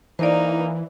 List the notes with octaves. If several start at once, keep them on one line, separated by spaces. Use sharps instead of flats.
E3 A#3 D#4 C5 D5